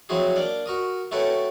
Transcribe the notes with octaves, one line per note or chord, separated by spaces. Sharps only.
F3 F#3 C4 E4 F#4 G#4
A#3 D4 D5
F#4 A#4 D#6
A3 F#4 A4 B4 C#5 G5